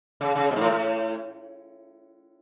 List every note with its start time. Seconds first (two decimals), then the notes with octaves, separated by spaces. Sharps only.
0.21 C#3
0.35 C#3
0.51 B2
0.56 G#2
0.61 A2
0.72 A2